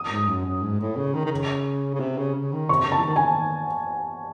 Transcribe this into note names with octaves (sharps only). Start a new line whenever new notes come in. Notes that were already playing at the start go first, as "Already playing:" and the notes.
Already playing: D#6
G#2
F#2
F#2
G#2
A2
C#3
D#3
D#3
C#3
C#3
C3
C#3
C#3
D#3
C3 C#6
C#3
A5
E3
D#3
C#3 G#5
D#3
D#3